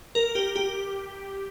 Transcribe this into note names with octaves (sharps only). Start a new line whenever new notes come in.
A#4
G4
G4